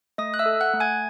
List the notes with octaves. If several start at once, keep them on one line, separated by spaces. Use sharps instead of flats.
A3 D#5 D#6
F#6
E5 E6
A4
F#5 F#6
A3
G#5 G#6